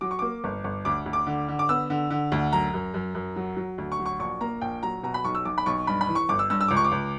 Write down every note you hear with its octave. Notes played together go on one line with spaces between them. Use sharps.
F#3 D6
C#6
A#3 D6
G1
G1
D2 D6
D2
D6
D3
D3
D6
B3 E6
D3
D3
D2
F#2 A#5
F#2
F#2
F#2
F#3
F#3
D2
C#6
F#3
C#6
A#1 C#6
A#3 A#5
A#1 G5
F#3 A#5
B2 A#5
B5
B1 C#6
E6
B1 D6
B5
B1 C#6
G2 B5
B5
E3
C#6
G1 D6
E6
G2 E6
E6
C#2 D6
C#6
D6
C#2